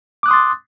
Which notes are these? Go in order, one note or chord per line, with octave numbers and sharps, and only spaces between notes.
C6 D6 D#6 F#6 A6